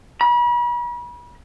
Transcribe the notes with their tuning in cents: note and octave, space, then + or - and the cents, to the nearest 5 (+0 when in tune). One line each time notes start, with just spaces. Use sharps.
B5 -40